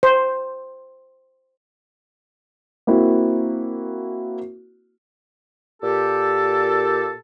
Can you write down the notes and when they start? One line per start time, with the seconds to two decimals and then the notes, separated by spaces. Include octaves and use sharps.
0.03 C5
2.87 A#3 C4 E4 F#4
5.83 A#2 G4 A4